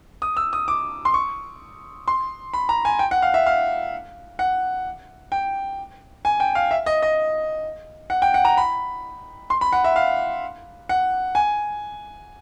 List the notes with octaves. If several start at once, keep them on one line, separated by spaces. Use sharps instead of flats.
D#6
E6
D#6
D6
C6
C#6
C6
B5
A#5
G#5
G5
F#5
F5
E5
F5
F#5
G5
G#5
G5
F5
E5
D#5
D#5
F#5
G5
F#5
A#5
B5
C6
B5
F#5
E5
F5
F#5
G#5